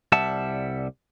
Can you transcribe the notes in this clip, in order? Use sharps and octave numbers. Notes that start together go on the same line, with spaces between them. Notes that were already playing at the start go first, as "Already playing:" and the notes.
C2 G3 E5 F#5 A5